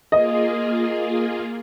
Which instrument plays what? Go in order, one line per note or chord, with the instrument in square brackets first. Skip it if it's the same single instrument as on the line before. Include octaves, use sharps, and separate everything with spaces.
[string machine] A#3 F4 G#4 [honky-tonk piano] D#5